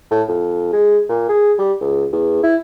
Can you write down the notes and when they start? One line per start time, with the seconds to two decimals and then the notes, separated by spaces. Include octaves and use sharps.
0.11 A2
0.28 F2
0.73 G#3
1.09 A#2
1.29 G#4
1.58 G3
1.81 C#2
2.12 E2
2.43 E4